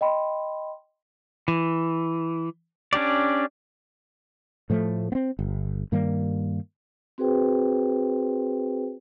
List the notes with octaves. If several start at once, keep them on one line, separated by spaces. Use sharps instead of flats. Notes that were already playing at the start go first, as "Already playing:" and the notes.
D#5 G5 B5 C6
E3
C#4 D4 G4 D5
A2 F3 A3
B3 C4
G1
G2 D#3 G3 A#3
C4 F#4 G#4 B4 C5 G5